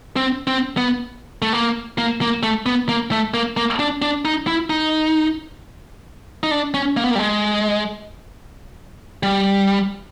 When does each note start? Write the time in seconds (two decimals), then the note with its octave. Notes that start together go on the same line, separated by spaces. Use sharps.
0.16 C4
0.47 C4
0.77 B3
1.42 A3
1.53 A#3
1.98 A#3
2.21 A#3
2.43 A3
2.66 B3
2.89 A#3
3.12 A3
3.34 A#3
3.57 A#3
3.79 D4
4.02 D4
4.25 D#4
4.47 E4
4.70 D#4
6.43 D#4
6.51 D4
6.74 C#4
6.97 A#3
7.04 B3
7.11 A#3
7.15 G3
7.19 G#3
9.23 G3